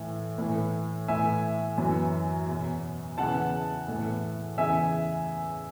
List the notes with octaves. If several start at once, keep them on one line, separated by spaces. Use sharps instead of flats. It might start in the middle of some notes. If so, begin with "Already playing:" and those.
Already playing: A2 E3
A2 E3
A2 E3 E5 G#5
F#2 E3
E2 B2
E2 C#3 E3 F#5 A5
A2 E3
E2 C#3 E3 E5 G#5